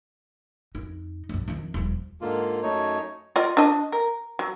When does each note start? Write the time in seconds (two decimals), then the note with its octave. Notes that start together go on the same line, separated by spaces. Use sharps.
0.75 F2 D#4
1.29 B1 F#2
1.48 F2 D#3
1.74 D#1 F3
2.21 G#2 D3 A#3 F4
2.63 F#2 A3 D#4 C#5
3.36 F4 D5 D#5
3.57 D4 D#5
3.92 A#4
4.39 F#3